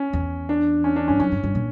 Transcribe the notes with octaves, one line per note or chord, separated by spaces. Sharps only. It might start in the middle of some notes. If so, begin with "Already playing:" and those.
Already playing: C#4
E2
D4
C#4
D4
G2 C#4
F#2 C#4
G2
G2
A#2